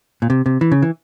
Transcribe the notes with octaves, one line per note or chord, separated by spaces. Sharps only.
A#2
C3
C3
E3
C#3
E3